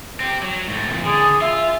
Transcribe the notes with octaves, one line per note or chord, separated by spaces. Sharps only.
C4 G4
F#3
G#2 A3
F2 A#2
D3 G#4
F4 E5